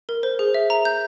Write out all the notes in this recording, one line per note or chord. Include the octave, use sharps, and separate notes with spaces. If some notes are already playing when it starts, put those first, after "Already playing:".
A#4
C5
G#4
E5
A#5
G6